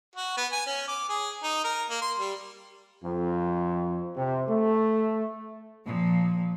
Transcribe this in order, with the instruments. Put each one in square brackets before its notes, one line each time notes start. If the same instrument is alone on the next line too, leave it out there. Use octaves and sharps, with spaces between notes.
[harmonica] F#4
B3
G#5
C#4
D6
G#4
D#4
A#4
A#3
C6
G3
[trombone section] F2
C3
A3
[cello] A#2 F3